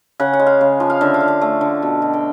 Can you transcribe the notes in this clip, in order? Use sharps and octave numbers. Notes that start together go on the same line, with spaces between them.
C#3 F#5
F#5
G#3
F5
C#3
F3
F5
D3 E5
F5
D3
F5
A3
D3
B2
B2
G5